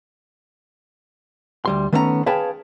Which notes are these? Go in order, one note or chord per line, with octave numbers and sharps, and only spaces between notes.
D2 G3 C6
D#3 A3 B3 C#4 D5 A#5
G#4 B4 C#5 F5 G5 A5